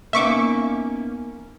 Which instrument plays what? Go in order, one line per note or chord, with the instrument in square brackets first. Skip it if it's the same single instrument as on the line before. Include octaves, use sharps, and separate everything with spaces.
[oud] A#3 B3 D#4 [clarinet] C#4 [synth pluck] E5 C#6 D6